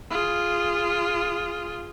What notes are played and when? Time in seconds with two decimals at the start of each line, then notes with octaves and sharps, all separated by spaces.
0.10 F4 G#4